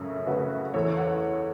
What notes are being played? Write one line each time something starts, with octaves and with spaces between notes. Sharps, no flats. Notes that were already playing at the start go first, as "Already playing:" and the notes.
Already playing: F#2 C#3 A3 C#4
C#3 A3 C#4 F#4 B4
E2 A4 C#5
C#5 F#5